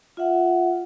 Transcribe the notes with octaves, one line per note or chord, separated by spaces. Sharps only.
F4 E5 F#5